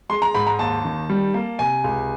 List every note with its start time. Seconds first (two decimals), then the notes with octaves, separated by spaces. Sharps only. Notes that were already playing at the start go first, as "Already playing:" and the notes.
0.09 G#3 C6
0.22 A#5
0.35 G#2 B5
0.47 A#5
0.59 D#2 A5
0.85 D#3
1.09 G3
1.34 A#3
1.59 C3 G#5
1.84 C#2